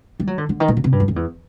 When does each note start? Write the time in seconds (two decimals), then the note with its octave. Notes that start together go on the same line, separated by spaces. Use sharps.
0.20 G3
0.27 F#3
0.38 D3
0.49 D3
0.60 D#3
0.68 A#2
0.77 B2
0.84 C3
0.92 G2
1.00 F#2
1.08 F2
1.16 E2